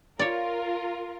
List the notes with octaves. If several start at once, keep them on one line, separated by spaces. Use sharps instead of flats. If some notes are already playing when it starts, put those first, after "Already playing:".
F4 A#4 C#5 D5